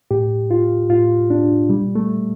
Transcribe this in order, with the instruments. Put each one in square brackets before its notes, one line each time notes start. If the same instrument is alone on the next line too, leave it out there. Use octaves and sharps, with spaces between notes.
[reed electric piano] A2 G4
F4
A2 F4
D4
A#2 G3
A3